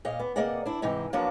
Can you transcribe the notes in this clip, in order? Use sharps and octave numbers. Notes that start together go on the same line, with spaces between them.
A#2 D#5 F5
B3
C3 A#3 G#4 D5 D#5 F#5
D4 E4
G#2 C3 E3 D#4
F3 F#3 A#3 B3 D4 F#4